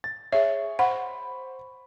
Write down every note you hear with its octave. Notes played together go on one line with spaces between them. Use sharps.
A6
G#4 C#5 E5
C5 F#5 B5 C#6